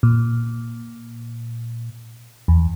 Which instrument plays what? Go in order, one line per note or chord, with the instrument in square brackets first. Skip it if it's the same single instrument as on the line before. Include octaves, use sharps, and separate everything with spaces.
[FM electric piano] A#2
E2